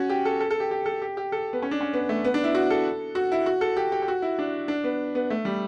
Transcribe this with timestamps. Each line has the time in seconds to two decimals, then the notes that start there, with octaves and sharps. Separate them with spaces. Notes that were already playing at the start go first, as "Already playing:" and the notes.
Already playing: C#4 F#4
0.10 G4
0.25 A4
0.40 A4
0.50 A4
0.60 G4
0.71 G4
0.86 A4
1.02 G4
1.17 G4
1.32 A4
1.53 B3
1.62 C#4
1.71 D4
1.81 C#4
1.93 B3
2.09 A3
2.25 B3
2.34 D4
2.44 E4
2.55 F#4
2.70 A4
3.15 F#4
3.32 E4
3.46 F#4
3.61 A4
3.77 G4
3.92 G4
4.02 G4
4.08 F#4
4.22 E4
4.39 D4
4.68 D4
4.84 B3
5.15 B3
5.30 A3
5.45 G3